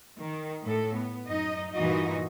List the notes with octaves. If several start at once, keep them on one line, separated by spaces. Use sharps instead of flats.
D#3
A2 A4
B3
F#2 D#4 D#5
G2 A#2 E3 D#4 F#4 D#5